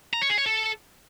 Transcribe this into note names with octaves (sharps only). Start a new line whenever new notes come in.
A#5
C#5
G#4
C#5
A4